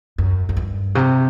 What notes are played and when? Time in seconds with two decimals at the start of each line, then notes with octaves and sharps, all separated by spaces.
0.18 F#2
0.49 F#2
0.57 G2
0.95 C3